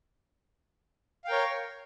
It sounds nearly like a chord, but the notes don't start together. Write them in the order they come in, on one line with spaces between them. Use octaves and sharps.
F5 G5 A#4 C#5